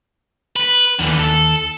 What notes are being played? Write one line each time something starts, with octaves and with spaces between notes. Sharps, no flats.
B4
D#2 D3 E3
A4